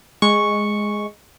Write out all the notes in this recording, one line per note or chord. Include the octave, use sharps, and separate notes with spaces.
G#3 C#6